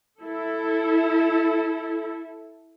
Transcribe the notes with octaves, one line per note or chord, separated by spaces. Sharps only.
E4 A4